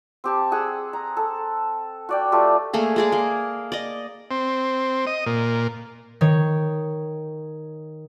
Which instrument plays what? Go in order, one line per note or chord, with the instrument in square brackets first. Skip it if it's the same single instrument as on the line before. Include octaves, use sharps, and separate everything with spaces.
[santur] C4 G4 A5
G#4 F#5 E6
A#5
A4
F#4 D5 G5
A3 F4 G4
[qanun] A3 A#3 G#4
G#3 G#4 D5
A#3
D5 D#5
[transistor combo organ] C4
D#5
A#2
[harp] D#3 C#5